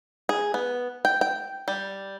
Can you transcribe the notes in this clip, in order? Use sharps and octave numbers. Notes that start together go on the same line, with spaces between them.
G#4
B3
G5
G5
G3